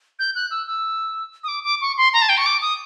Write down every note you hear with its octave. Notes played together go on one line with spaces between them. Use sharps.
G6
F#6
E6
E6
D#6
D6
D6
C#6
C6
A#5
A5
G5
C#6
D6
D#6